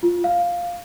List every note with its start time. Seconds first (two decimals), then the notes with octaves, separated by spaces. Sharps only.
0.03 F4
0.24 F5